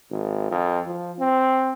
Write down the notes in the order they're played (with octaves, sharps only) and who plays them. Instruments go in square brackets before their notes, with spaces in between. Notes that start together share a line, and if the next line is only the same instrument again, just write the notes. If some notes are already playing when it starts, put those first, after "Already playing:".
[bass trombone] G#1
F2
F3
C4